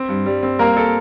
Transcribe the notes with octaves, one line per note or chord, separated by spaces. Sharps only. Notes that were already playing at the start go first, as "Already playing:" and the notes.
Already playing: C4
G2
G3
C4
G3 A#3 A#4
A4